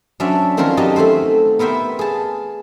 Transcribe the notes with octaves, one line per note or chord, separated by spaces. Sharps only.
F#3 C#4 D4 C5 D5 E5
D#3 F3 C4 C#4 A#4 C#5
F#3 D#4 G4 D#5 A5
A3 C4 A4 C5
B3 A#4 C5 E5 G5
G#4 A5